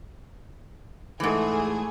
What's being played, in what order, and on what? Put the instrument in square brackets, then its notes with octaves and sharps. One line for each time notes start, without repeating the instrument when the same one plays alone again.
[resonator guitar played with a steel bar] G#2 E3 [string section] A3 G#4